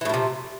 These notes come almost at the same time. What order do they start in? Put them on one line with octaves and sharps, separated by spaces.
E3 A2 F3 C3